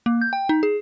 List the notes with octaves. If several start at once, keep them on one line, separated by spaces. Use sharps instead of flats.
A#3
G6
G5
D#4
G#4